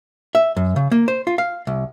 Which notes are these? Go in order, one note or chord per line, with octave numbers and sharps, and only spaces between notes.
E5
F#2
C#3
A#3
C5
F4
F5
C2